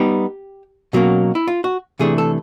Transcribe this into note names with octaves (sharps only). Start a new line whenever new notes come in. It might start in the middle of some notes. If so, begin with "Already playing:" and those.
Already playing: G3 B3 D#4 G4
B2 F#3 A#3 C#4 F#4
E4
F4
F#4
C3 E3 A3 D4 G#4
A4